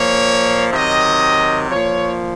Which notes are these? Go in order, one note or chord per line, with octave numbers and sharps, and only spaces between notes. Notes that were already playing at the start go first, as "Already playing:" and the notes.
Already playing: A#2 F3 C#5
C3 D#3 F#3 D#5
A#2 F3 C#5